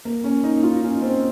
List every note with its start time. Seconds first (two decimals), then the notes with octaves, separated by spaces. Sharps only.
0.05 A#3
0.24 C#4
0.44 D#4
0.63 F4
0.83 C#4
1.02 C4